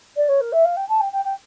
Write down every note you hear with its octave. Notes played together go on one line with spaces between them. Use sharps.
D5
C#5
A#4
E5
F5
G5
A5
G5
G5
G5